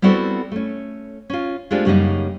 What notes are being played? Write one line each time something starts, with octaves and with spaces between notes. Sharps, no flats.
G3 B3 C4 E4 F#4 A4
A3 C#4
C#4 F4
G#3 A3 C4 D4 F4 G4
F#2 C#3 G3 A3 A#3 D#4